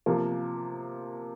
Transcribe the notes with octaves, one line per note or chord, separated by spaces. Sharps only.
C3 F3 A#3